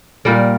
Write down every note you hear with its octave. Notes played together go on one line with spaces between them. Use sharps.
A#2 G3 A#4